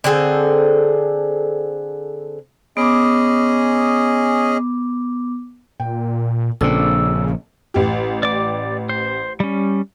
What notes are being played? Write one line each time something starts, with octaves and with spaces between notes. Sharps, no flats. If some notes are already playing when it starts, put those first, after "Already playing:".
D3 C4 G#4 A4
B3 C#4 G#4 D#5 D6
A#2 G5
A#1 A#2 C#3 C4 D4 A4 E6
A1 G4
D5 D6
C5
G3 C#4